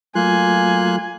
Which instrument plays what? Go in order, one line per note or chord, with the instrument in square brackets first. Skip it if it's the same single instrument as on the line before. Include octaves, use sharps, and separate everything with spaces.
[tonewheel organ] F#3 A3 F4 [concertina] A#3 C6 F#6 [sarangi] G#5